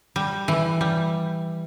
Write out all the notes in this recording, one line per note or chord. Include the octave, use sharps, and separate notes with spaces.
G3
E3
G3